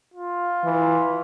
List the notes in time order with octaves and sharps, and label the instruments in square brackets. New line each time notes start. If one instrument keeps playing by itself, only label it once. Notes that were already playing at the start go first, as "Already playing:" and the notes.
[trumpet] F4
[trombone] E3